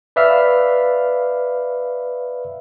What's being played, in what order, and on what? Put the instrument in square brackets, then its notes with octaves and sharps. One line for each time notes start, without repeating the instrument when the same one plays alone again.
[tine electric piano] B4 D5 E5 F5 F6